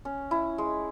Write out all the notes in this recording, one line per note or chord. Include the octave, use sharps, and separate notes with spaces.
C#4
E4
G#3